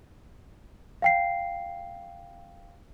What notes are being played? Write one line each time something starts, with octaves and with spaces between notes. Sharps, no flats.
F5 G5 C7